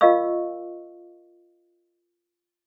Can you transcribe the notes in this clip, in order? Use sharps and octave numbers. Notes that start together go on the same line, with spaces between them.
F4 A#4 D#5 F5 C#6 E6